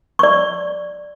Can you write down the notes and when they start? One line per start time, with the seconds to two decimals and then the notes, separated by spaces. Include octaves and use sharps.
0.19 D5 C#6